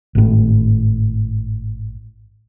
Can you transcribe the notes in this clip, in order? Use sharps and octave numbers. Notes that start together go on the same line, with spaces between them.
G#1 A2